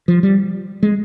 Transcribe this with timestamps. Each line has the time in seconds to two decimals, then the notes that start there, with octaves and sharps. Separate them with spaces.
0.08 F3
0.23 G3
0.83 G#3